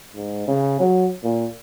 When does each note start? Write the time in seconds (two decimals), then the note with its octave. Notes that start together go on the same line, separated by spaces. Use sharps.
0.16 G#2
0.48 C#3
0.80 F#3
1.24 A#2